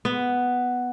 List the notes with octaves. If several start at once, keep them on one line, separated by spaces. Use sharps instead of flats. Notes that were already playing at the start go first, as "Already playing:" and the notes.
B3